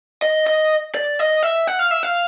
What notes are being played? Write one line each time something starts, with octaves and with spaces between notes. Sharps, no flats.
D#5
D#5
D5
D#5
E5
F#5
F5
E5
F5